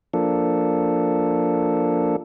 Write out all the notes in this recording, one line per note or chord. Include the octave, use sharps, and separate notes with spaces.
F3 A#3 D4 A4